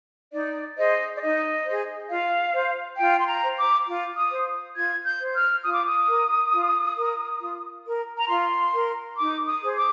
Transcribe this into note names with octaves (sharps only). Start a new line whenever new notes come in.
D#4 D5
G#4 C5 D#5
D5
D#4 D#5
G#4 C5
F4 F5
C5
F4 G5
C6
A#5
C5
D6
F4
D#6
C5
F4 G#6
G6
C5
F6
F4 D#6
D6
D#6
A#4
F4
A#4
F4
A#4
A#5
F4 C6
A#4
D#4 D6
D#6
G#4 C5
D6